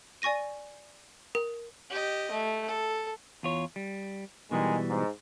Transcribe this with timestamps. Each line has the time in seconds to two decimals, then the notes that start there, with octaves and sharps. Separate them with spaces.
0.22 D5 G#5 C#6 A#6 D#7
1.35 A#4
1.90 G4 D#5
2.31 A3
2.67 A4
3.43 E2 F4 C#5
3.76 G3
4.51 B2 D#3 E3 G3 G#3
4.88 G#2